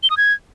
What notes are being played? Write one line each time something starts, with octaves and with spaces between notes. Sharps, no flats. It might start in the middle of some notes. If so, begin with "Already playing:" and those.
G7
D#6
G#6